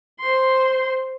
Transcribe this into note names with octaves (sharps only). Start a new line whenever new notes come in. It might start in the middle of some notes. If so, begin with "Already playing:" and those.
C5 C6